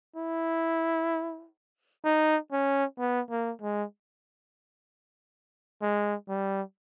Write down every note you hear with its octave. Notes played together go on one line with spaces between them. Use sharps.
E4
D#4
C#4
B3
A#3
G#3
G#3
G3